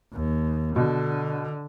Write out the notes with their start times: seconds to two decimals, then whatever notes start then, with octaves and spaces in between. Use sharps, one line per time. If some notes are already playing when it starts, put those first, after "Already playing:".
0.13 D#2
0.76 B2 D3